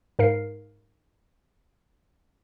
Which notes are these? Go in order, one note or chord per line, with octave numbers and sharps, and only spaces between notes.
G#2 A#4 F5 C7